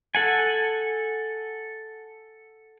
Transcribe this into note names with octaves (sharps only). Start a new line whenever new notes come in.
A4 F#5 G#5